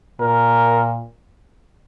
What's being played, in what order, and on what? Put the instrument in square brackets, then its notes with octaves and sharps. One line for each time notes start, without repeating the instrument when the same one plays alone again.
[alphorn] A#2 [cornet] A#4